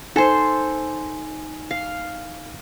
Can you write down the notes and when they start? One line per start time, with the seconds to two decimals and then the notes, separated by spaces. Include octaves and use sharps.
0.16 D#4 A4 C5 G#5
1.71 F5